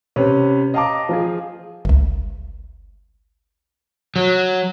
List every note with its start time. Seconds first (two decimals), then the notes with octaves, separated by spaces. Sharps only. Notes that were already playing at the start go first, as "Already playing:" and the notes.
0.16 C3 C#4 B4
0.74 D#5 F5 G5 A5 A#5 D6
1.09 F3 F4 G#4
1.85 G1 C#2
4.16 F#3